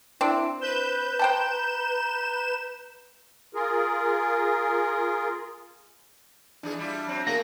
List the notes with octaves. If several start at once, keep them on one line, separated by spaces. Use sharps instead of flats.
C4 D4 E4
B4 C5 G6 E7
C5 G5 A5 A#5
F4 G#4 A#4
E3 D4 D#4 G#4
G3 E4 F4
F#3 C4
A#3 F#4 G#4 A#6